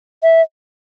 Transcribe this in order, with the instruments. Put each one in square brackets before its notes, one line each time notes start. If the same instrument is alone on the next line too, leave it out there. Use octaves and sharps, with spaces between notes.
[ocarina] E5